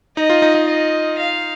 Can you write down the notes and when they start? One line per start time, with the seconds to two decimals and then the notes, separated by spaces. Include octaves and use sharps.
0.17 D#4 D#5
0.30 F4
0.42 D#4
0.55 D#4
0.67 D#5
1.18 F5